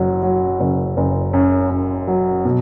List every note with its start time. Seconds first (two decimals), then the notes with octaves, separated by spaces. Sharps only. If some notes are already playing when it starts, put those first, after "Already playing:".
Already playing: F#1 F#3
0.23 F#3
0.60 F#1
0.97 F#1
1.33 F#2
1.70 F#2
2.08 F#3
2.45 B2